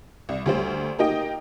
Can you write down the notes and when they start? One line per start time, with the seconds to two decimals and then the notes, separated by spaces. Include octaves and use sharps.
0.29 C2
0.46 D2 G3 C5
0.99 A#3 D#4 G4 D#5 G5